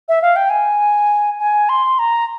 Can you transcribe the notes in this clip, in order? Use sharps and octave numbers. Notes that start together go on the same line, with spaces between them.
E5
F5
G5
G#5
G#5
C6
A#5